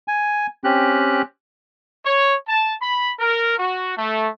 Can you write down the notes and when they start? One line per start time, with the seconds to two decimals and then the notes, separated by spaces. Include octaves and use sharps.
0.08 G#5
0.64 C4 C#4 G4 F#6
2.06 C#5
2.48 A5
2.81 B5
3.19 A#4
3.58 F#4
3.96 A3